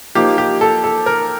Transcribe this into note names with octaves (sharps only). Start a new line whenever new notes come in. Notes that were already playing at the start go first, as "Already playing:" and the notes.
F3 A#3 D#4 G4
G4
A4
A4
A#4